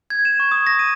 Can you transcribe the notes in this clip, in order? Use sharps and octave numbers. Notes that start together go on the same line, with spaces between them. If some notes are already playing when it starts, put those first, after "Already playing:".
G#6
E7
C#6
D#6
A#6
D#7